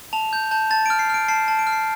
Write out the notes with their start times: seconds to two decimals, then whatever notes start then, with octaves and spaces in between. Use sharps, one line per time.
0.13 A5 F7
0.33 G6
0.51 A5 G6
0.71 A5 A6
0.86 F6 D7
0.99 C7
1.10 F6 D7
1.28 A5 C7
1.48 A5
1.59 D7
1.67 F6
1.72 C7